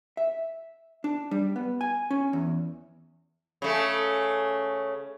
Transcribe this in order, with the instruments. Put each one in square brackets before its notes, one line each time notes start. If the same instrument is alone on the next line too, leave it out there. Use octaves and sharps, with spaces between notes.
[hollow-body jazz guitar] E5
D4
G3
B3
G#5
C#4
E2
[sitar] C#3 A3